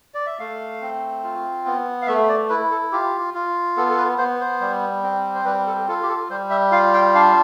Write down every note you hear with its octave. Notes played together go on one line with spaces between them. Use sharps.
D5
E5
A3 F5
C4
F4
B3
F5
A3 E5
D5
E4 B4
A4
F4 G4
F4
B3 A4
A4
B4
B3 C5
C5
G3
C4
C5
G3 B4
A4
F4 A4
G4
A4
G3 C5
E5
F4 F5
G5
D4 F5